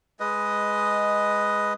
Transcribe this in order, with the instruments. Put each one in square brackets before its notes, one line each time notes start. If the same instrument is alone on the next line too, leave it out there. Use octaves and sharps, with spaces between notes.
[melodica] G#3 B4 D#5